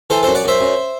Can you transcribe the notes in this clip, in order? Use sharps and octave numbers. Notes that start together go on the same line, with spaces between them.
E3 A4 C5
A4 C5
F#2
D5 F#5
F#2 C5 E5
F#2